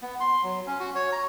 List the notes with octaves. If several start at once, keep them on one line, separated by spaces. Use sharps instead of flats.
B3
C6
F#3
C#4
F#4
C#5
A#5